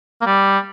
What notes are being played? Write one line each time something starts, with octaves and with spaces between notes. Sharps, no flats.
A#3
G3